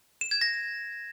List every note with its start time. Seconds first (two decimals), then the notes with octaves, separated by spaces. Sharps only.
0.21 E7
0.31 G#6
0.41 A#6